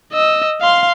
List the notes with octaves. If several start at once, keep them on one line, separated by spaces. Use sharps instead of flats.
D#5 E6
F5 C6